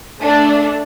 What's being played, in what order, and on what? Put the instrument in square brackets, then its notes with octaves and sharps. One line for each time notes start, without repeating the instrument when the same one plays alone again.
[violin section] A3 D4